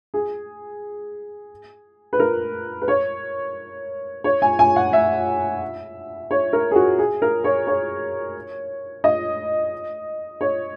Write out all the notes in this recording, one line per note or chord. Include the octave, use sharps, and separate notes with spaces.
G#4
B4
A#4
B4
C#5
C#5
G#5
G#5
F#5
E5
C#5
A#4
G#4
F#4
G#4
A#4
C#5
C#5
D#5
C#5